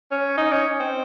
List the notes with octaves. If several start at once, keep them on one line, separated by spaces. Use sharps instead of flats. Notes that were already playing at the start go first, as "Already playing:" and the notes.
C#4
D#4
C#4
C4